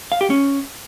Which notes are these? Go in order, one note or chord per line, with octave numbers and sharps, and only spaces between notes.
F5
G4
C#4